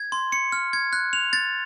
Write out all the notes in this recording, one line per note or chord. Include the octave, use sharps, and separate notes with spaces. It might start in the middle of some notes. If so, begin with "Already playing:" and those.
Already playing: G#6
C6
C#7
F6
G#6
F#6
F7
A6